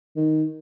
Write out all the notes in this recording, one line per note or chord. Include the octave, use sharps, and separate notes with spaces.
D#3